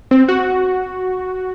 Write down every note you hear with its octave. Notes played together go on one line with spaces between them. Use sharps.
C4
F#4